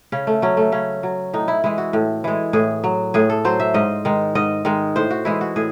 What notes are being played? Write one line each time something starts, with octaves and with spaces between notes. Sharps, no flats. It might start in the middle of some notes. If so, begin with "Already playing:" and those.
C#3 C#4
A3
F#3 C#4
A3
C#3 C#4
F#3
A2 D#4
E4
E3 G#3 E4
F#4
A2
E3 G#3
A2 G#4
F#3
A2 G#4
A4
F#3 C5
E5
G#2 D#5
D#3 G#3
G#2 D#5
D#3 G#3
A2 C5
F#4
E3 G#3 E4
F#4
A2 G#4